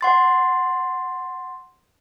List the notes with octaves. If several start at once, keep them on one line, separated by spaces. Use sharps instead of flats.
F#5 C6 A6